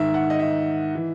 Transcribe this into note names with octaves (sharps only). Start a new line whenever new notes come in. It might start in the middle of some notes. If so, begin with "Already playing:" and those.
Already playing: G#2 D#3 E5
F#5
D#5
E5
E3